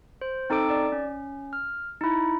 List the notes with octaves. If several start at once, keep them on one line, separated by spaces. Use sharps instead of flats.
C5
C4 D#4 A4 D6 D7
D5
C#4
F6
D#4 E4